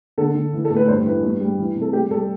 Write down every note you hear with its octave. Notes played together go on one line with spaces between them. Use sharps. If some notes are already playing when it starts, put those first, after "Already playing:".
D3 A4
D3
E3
A4
A2
B4
G2 C5
E3 B4
G2
G3
E3
C3
A4
G3 G4
G3 A4